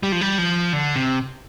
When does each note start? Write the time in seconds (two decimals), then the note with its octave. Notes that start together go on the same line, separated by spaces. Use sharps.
0.03 G3
0.12 F3
0.21 G3
0.38 F3
0.73 D3
0.96 C3